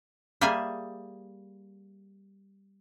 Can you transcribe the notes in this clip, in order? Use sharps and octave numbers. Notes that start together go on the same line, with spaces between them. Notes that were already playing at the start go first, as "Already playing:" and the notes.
G3 A#3 G#4 E5 G#5